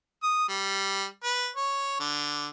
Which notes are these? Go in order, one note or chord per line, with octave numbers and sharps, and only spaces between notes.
D#6
G3
B4
C#5
D3